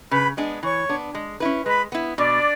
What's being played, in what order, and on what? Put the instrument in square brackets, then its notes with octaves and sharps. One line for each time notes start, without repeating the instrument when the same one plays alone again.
[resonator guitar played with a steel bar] C#3 [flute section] B4 B5
[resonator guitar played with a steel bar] G#3 B3 D4 G#4
[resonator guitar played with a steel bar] E3 [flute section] C#5 C#6
[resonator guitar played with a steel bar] B3 D4
G#3
C#4 E4 B4
[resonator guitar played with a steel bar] G#3 [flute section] B4 B5
[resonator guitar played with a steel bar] B3 E4
[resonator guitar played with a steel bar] B2 [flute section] D4 D5